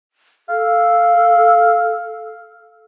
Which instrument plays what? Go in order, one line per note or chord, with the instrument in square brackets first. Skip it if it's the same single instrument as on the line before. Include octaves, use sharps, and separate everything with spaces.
[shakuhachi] A4 [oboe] F5